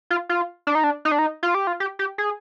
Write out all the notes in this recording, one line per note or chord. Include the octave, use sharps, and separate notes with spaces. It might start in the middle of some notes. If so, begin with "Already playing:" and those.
F4
F4
D4
D#4
D4
D#4
D4
D#4
F4
G4
F4
G4
G4
G#4